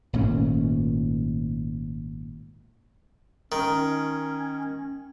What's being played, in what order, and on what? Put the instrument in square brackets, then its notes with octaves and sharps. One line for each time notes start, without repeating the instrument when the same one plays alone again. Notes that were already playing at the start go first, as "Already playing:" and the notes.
[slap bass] G#1 A#2 A3 C#4
[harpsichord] D#3 [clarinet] C#4